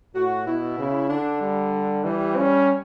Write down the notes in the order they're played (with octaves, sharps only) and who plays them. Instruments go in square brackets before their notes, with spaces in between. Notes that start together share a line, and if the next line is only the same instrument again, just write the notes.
[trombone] A2 [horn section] F#4
[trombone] B2 [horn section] E4
[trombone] C#3
[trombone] D3 [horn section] D4
[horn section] G3
[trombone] E3 [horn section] G3
[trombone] C#4